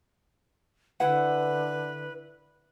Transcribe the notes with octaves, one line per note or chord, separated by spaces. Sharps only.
D3 E4 B4 F#5